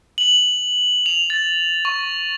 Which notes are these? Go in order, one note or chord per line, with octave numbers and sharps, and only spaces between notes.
F#7
F7
A6
C#6